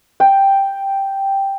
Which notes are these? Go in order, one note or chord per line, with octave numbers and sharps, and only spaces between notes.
G5